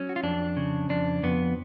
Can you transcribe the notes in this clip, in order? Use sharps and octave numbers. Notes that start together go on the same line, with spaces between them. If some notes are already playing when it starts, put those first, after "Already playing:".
Already playing: F#3 C#4
F#4
F4
F2 D4
C#3
F2 D4
F2 B3